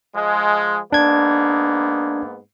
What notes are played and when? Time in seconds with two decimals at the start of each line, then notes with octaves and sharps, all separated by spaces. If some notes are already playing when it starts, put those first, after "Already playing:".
0.15 F3 G#3
0.92 G#2 A#3 B3 D4 G#6